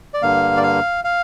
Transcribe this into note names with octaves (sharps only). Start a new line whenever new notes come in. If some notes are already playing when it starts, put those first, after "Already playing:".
D5
G2 D3 A#3 F5
D5
F5
F5